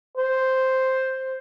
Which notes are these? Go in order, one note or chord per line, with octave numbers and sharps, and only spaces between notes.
C5